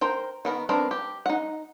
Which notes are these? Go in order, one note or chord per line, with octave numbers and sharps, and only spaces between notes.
A#4 C5 G5
D#3 B3 A#4
B3 C4 D4 A#4
G4
D#4 F#5